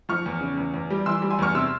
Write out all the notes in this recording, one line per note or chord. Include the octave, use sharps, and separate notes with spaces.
F3 C#6 F6
E2
C#3
E2
E2
G3
E3 C6 E6
G3
G#5 C6
E2 C#6 F6
C3 C6 E6